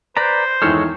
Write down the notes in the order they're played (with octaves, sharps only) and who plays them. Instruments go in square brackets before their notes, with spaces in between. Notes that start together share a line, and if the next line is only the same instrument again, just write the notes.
[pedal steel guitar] B4 D5 A#5 [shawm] C5
[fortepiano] E2 D#3 F6 [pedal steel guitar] G#3 A4 C#5